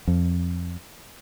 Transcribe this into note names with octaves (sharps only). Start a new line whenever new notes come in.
F2